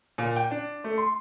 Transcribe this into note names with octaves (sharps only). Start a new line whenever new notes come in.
A#2
G5
D4
A3
C6